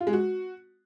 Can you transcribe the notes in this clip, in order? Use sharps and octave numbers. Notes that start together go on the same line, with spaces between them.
F4
G#3
F#4